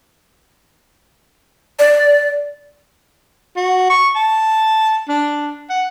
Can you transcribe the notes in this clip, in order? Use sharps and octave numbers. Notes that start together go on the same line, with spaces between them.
D5
F#4
C#6
A5
D4
F#5